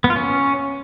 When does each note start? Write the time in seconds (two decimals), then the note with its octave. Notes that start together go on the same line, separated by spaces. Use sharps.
0.04 B3
0.10 F4
0.16 C#4